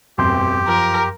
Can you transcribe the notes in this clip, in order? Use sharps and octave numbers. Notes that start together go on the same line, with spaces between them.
E1 A1 F#2 C4 G4 C6 G6
F3 A#4